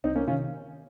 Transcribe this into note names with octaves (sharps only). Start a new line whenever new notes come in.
C2 C4 D#4
A#3 C#4
C3 D#3 C#4 F4